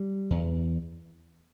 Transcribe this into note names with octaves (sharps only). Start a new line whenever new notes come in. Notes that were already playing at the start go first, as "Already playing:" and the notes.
Already playing: G3
E2